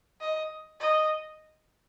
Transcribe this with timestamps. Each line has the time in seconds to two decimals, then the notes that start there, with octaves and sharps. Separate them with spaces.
0.21 D#5
0.80 D#5